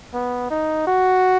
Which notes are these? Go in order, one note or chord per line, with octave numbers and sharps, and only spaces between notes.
B3
D#4
F#4